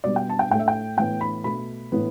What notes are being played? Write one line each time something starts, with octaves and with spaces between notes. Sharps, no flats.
B2 G3 B3 D5
G5
A5
G5
A2 A3 G5
E5
G5
A2 E3 B3 G5
B5
B2 A3 B5
A2 E3 B3